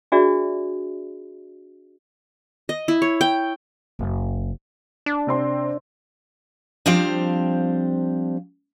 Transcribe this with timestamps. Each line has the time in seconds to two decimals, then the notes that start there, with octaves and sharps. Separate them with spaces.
0.12 D4 F#4 G#4 D5 E5
2.69 D#5
2.88 E4
3.02 C#5
3.21 G5
3.99 F#1
5.06 D4
5.27 C3 C4 C6
6.86 F3 G3 C4 D4 C5 F5